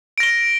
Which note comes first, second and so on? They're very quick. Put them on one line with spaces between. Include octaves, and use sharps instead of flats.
D7 A#6 G7